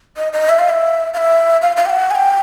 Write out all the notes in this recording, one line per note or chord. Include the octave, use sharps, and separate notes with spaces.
D#5
D#5
E5
F5
E5
F5
E5
F5
F5
G5
F#5
G#5
G5